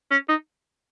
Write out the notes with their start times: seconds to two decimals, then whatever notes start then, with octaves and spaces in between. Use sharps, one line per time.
0.11 C#4
0.29 D#4